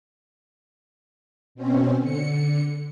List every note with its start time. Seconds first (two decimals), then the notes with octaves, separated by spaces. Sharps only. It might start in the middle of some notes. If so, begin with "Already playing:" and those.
1.55 B2 C4 C#4
1.98 D3 C#7